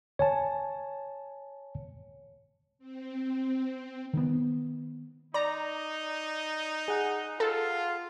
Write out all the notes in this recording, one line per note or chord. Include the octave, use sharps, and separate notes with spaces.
C#5 G#5 A5
C4
D#3 B3
D#4 D5 A#5
G#4 F#5
F4 A4